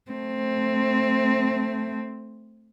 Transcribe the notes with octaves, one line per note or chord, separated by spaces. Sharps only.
A3 C4